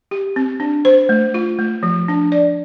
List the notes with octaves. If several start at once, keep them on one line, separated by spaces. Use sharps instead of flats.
G4
C4
D4
C5
A3
F4
A3
F3
D4
D5